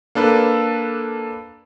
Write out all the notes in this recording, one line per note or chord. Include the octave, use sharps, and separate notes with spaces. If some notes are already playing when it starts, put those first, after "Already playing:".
A#3 D4 A4 B4